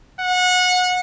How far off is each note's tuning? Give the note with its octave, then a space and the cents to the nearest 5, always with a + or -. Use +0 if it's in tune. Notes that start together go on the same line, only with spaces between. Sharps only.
F#5 -25